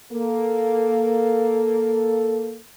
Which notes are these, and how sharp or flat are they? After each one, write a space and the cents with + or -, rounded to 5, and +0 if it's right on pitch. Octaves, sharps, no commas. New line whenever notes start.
A#3 +0 A4 +0